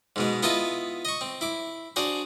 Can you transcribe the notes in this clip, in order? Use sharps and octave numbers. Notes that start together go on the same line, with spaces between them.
G#2 B2 G#3
B3 E4 F4 B4 D#5 A5
D#5 C#6
C4
E4 D6
D4 F#4 G#4 C5